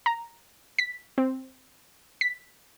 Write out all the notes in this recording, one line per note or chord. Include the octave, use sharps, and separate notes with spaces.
A#5
B6
C4
B6